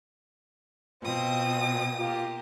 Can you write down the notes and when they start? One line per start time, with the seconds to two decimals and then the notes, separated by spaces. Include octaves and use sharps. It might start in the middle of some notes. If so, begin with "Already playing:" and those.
1.03 B2 C4 F4 D#6
1.97 A#3 F4 G4